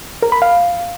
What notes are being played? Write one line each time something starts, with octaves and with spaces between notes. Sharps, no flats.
A#4
B5
F5